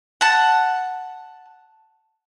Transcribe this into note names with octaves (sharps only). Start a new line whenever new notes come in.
F#5 A5